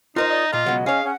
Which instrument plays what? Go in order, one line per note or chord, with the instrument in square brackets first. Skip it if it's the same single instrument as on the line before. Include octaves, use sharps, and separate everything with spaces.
[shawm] D#4 [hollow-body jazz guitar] F4 A#4 C5 [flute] D#5
[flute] D5 [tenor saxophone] D#5
[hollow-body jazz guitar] A#2 A#5 [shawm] F4 [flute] D#5
[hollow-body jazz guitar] C#2 B2 [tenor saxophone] F#3
[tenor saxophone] C#4 [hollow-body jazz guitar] G#4 C#5 [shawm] F5
[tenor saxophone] C#4 [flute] F#5